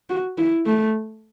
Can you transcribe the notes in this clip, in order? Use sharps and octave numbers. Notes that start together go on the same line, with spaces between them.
F#4
E4
A3